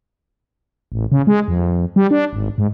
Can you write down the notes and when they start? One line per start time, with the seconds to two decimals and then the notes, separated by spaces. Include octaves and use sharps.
0.92 A1
1.12 C#3
1.27 G#3
1.48 F2
1.96 G3
2.11 D4
2.33 G#1
2.58 G#2